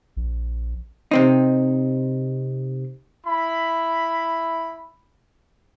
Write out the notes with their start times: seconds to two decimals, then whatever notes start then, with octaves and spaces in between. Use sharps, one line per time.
0.17 A#1
1.11 C3 C4 D#4
3.27 E4 B5